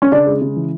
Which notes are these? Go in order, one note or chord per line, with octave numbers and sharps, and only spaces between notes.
C#4
C#3 D4
G#3
C#3
E3